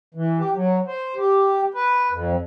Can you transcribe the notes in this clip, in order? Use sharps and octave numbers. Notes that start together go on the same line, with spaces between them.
E3
G4
F#3
C5
G4
B4
F2